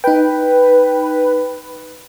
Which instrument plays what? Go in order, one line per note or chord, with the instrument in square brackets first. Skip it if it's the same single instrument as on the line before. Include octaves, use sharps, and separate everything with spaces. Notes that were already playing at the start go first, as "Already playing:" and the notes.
[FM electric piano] D#4 G5 [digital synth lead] B4